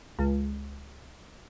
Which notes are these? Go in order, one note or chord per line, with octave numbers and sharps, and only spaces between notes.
C#2